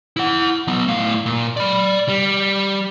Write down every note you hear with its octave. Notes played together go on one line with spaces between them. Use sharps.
E4 F#5
F#3 B3
A2 F5
A#2
D5 B5
G3